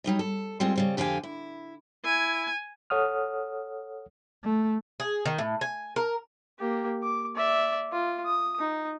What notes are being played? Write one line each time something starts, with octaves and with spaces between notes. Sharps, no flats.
F#3 G3 D#4 D#5
A4
G3 G#3 C4 F4 G#4
C#3 G3 C4
F2 D3 G4 F5 G5 G#5
E4
E4 G#5
A4 C#5 F#5 D#6 F6
A3
G#4
D#3
A2
G#5
A#4
A#3 G4
D6
D5 E5
F4
D#6
D#4